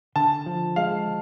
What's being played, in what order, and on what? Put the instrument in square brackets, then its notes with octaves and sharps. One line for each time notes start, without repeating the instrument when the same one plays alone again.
[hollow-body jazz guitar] D3 [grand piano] A5
[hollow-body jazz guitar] F3
[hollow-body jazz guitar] G#3 [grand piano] F5